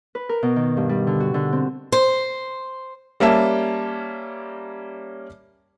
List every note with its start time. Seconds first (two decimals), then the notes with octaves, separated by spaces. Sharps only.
0.15 B4
0.29 A#4
0.43 B2
0.56 D#3
0.77 G2
0.89 G3
1.07 D3
1.20 F#4
1.34 D3
1.52 C4
1.92 C5
3.20 G3 A#3 C#4 E5 A5